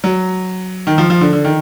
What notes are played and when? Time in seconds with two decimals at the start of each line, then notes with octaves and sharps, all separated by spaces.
0.04 F#3
0.87 D#3
0.98 F3
1.10 F3
1.21 D3
1.33 D3
1.44 D#3